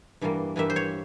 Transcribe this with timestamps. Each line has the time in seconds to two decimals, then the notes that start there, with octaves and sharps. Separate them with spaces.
0.21 G2 E3 G3 A#3
0.56 G2 E3 G3 A#3 E5
0.70 C5
0.76 C#5